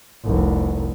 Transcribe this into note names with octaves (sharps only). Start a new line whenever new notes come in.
F1 C2